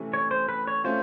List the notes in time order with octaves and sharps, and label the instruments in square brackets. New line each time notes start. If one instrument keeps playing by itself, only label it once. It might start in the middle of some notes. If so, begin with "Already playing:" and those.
Already playing: [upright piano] C3 E3 A3 C#4
[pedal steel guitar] C#5
C5
B4
C#5
[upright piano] A3 C#4 F4 [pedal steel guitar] C5